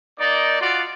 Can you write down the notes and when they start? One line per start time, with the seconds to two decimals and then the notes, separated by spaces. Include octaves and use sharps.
0.19 A#3 D#4 D5
0.60 F4 F#4 D5